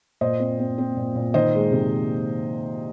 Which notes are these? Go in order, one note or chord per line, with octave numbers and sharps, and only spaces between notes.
A#2 C5 D#5
C4
C4
C4
A#2
A#2
D#3 C5 D#5
G#3
C3